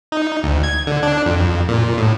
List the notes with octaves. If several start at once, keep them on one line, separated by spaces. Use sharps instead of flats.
D#4
D2
G#6
D3
D4
F2
A#2
A2